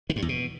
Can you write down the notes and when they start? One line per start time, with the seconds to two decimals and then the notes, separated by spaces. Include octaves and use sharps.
0.10 D#3
0.16 G2
0.22 E2
0.29 B2